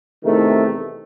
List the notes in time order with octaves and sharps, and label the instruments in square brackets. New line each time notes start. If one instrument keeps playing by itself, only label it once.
[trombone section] E2 C3 D#3 A3